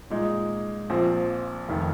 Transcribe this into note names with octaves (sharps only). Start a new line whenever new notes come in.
A#2 G#3 D#4
A#1 A#2 F3 C4
F1 D#3